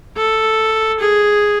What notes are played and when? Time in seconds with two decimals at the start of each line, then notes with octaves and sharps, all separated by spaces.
0.17 A4
1.00 G#4